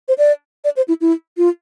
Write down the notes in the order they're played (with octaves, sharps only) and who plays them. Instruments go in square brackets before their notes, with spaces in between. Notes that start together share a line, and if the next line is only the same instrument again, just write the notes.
[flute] C5
D5
D5
C5
E4
E4
F4